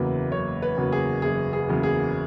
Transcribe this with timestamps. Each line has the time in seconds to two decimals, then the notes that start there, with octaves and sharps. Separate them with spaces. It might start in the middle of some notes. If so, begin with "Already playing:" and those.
Already playing: F#1 E2 C#3 F#3 A#3 B4
0.32 F#1 C#5
0.62 B4
0.77 E2 C#3 F#3 A#3
0.92 G#4
1.22 F#1 G#4
1.53 G#4
1.68 E2 C#3 F#3 A#3
1.83 G#4